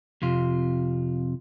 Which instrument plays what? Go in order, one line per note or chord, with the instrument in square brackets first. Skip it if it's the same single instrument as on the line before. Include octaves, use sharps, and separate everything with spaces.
[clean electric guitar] F2 C3 F4